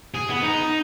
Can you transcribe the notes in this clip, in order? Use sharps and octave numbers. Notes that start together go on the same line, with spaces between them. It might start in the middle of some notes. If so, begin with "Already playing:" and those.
G#4
B3
D#4